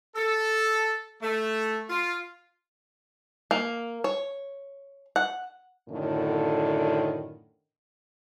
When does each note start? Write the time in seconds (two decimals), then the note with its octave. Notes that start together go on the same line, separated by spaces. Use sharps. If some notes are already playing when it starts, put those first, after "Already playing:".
0.16 A4
1.22 A3
1.90 F4
3.51 A#3
4.04 C#5
5.16 F#5
5.89 F#2 A2 D3 D#3